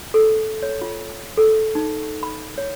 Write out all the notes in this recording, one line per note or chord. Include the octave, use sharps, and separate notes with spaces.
A4
C#5
F4
A4
D#4
B5
C#5